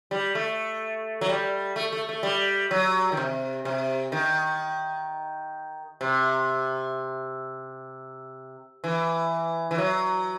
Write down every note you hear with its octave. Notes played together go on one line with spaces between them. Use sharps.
G3
A3
F#3
G3
A3
A3
A3
G3
F#3
D#3
C3
C3
D#3
C3
E3
E3
F#3